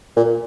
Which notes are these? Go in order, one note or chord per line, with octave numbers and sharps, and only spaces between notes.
A#2